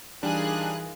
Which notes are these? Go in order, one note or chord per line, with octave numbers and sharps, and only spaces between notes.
E3 G3 D4 D#4 F4 G#4 A#4 F#6